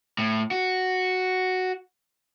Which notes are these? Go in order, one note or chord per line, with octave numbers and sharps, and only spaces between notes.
A2
F#4